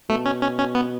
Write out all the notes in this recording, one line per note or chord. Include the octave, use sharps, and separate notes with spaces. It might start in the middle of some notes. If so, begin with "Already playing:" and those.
B2 A3
C#4
C#4
C#4
B3